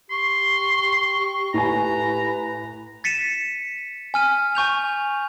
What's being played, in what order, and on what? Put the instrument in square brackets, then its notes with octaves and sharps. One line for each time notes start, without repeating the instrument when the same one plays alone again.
[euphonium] G4 [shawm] C6 [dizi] C#6
[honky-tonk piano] A2 G#5 [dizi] B4 [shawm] A#5
[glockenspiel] A6 B6 C#7 D#7 E7
G#5 F6 D#7
G#5 C#6 G6 F7